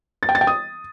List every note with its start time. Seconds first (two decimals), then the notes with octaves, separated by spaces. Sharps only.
0.23 A6
0.29 G5
0.35 A6
0.41 G5
0.47 D#6